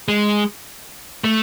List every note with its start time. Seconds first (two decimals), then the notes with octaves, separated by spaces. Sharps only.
0.08 G#3
1.24 A3